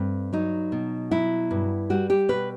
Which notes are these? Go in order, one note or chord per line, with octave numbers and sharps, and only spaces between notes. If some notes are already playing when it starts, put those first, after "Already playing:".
Already playing: G2 A3 C4
F#3 D#4
B2
F#3 E4
G2
G3 F#4
G4
B2 B4